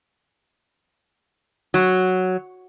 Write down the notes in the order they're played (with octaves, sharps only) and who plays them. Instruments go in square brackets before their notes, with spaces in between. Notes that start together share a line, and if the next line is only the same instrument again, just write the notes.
[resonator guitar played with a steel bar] F#3